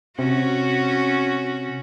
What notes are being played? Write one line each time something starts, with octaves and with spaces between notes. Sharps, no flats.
C3 C#4 F#4